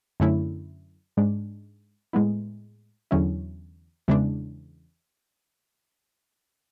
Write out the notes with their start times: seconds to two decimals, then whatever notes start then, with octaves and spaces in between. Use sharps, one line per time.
0.20 F#2 D3 A3 C#4 E4
1.17 G#2 G#3 D4
2.13 A2 G#3 B3 E4
3.11 E2 D3 F#3 C#4 E4
4.08 E2 C#3 E3 G#3 D4